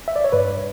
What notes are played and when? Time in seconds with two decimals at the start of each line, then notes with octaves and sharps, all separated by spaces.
0.08 E5
0.16 D5
0.24 C#5
0.32 G2 B4